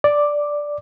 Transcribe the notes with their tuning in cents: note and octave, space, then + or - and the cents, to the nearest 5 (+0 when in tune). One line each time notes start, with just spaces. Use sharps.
D5 +0 D6 +5